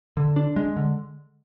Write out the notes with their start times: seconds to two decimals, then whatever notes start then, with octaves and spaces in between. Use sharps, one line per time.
0.17 D3
0.36 D4
0.56 G#3
0.76 D3